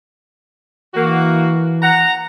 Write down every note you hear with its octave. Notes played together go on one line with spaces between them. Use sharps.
E3 A#3 F#4
F#5 A#5